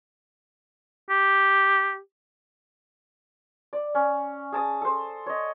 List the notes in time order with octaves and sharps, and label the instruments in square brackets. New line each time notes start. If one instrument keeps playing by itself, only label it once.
[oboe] G4
[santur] D5
C#4
G#4 A5 D#6
A4 C5
C#5 D#5